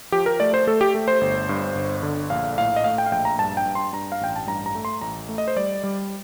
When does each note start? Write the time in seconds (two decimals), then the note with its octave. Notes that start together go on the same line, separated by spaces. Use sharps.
0.12 F3 G4
0.26 A#4
0.40 A3 D5
0.54 C5
0.67 A3 A4
0.81 G4
0.95 A3
1.08 C5
1.21 G1
1.49 G2
1.75 G1
2.03 D3
2.30 A#1 F5
2.58 A2 F5
2.76 D#5
2.84 A3 F5
2.98 G5
3.06 F5
3.12 A#1 G5
3.25 A#5
3.39 G2 A5
3.57 G5
3.66 G2
3.75 C6
3.93 G2 A#5
4.12 F5
4.21 A1 G5
4.36 A5
4.47 G2 A#5
4.66 A#5
4.75 A3
4.85 C6
5.01 A1 A#5
5.29 A3
5.38 D#5
5.48 C5
5.56 G3 D5
5.83 G3